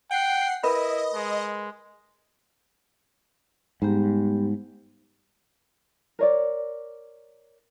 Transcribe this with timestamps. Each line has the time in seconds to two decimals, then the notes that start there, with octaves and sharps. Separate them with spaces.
0.11 F#5 G5 C7
0.63 E4 A#4 B4 D#5 B5
1.14 G#3
3.82 G#2 G3 B3 G4
6.19 A#4 C#5 D5